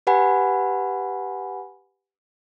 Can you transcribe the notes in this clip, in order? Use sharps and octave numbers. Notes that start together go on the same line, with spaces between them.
G4 B4 F#5 G#5 B5